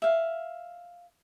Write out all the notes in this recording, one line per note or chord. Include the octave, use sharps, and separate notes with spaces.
E5 F5